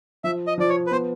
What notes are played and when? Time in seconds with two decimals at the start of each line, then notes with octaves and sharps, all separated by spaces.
0.24 F3 E5
0.47 D#5
0.58 F3 D5
0.69 C#5
0.86 B4
0.91 B3 C5